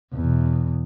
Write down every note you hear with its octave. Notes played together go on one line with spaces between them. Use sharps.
E2 B2